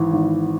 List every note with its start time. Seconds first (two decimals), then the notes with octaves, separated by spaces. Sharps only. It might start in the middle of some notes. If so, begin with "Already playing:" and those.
Already playing: G#1 E3
0.12 G#1